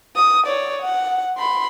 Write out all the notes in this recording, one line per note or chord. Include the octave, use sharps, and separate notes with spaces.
D#6
C#5 D5
F#5
B5 C6